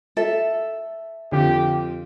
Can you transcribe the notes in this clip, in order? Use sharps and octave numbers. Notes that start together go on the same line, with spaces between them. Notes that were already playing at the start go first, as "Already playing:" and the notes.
A4 E5
F2 D3 F4 G4